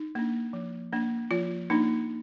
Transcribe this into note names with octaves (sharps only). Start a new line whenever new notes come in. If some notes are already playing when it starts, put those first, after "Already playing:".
Already playing: D#4
A#3 D4
F3
A#3 D4
F3 F4
A#3 D4 D#4